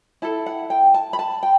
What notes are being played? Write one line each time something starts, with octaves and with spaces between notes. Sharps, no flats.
E4 A4 A5
F#5
G5
A5
B5
A5
G5